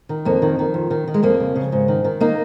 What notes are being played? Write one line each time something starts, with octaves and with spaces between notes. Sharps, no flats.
D#3
F2 A#3
D#3
D#3
F2
D#3
D#3
G#3
F2 A#3
C#3
C#3
G#2
D#3
D#3
A#3 D#4